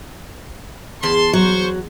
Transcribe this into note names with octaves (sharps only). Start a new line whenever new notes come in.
E2 A5 B5 C6
F#3 C5 C#6